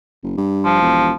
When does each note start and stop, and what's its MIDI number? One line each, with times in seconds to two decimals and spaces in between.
0.23 0.36 30
0.37 0.78 43
0.64 1.12 53
0.82 1.11 28